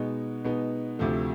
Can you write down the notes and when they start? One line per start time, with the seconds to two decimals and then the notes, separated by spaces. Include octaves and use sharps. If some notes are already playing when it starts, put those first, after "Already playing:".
Already playing: B2 G#3 B3 D#4
0.44 B2 G#3 B3 D#4
0.99 D2 C3 F3 A3